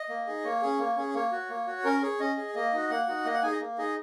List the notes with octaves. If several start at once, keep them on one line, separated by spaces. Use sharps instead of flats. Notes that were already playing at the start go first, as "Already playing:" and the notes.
Already playing: D#5
A#3
D#4 G#4
A#3 C#5
C#4 G#4
A#3
C#4 G#4
A#3 C#5
F#4
A#3
F#4
C#4 A#4
G#4 C#5
C#4 D#5
G#4
A#3 D#5
D#4 F#4
A#3 F#5
D#4 F#4
A#3 D#5
F#5
D#4 G#4 G#5
D#5
A#3
D#4 G#4 D#5